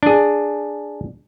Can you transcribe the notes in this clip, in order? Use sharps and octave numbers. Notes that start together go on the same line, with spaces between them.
D4 G#4